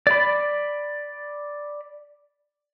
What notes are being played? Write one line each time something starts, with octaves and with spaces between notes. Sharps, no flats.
D5 B5